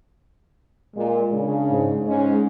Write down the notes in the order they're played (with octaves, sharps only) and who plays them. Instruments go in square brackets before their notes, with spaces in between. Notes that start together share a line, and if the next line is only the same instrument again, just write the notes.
[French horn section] A#2 [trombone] G#3
[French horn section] C#3 [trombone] D4
[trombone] G#2
[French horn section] G#2 C#4 [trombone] G#3